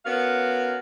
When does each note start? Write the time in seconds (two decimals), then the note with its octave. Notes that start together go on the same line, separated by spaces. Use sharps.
0.05 B3 C#4 F#4 A#4 F5